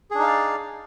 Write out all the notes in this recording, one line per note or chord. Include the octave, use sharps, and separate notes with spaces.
D4 D#4 G#4 D5 F5